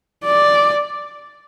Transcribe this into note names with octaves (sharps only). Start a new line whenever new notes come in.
D5